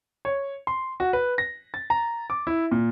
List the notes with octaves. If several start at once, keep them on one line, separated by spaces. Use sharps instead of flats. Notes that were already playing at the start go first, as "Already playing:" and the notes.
C#5
C6
F#4
B4
A#6
A6
A#5
D6
E4
A#2